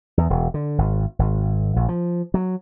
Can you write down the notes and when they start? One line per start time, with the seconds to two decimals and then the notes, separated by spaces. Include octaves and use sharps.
0.17 E2
0.30 E1
0.54 D3
0.78 G#1
1.19 G#1
1.76 A#1
1.89 F3
2.34 F#3